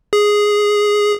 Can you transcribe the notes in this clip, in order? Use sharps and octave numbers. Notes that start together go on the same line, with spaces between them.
G#4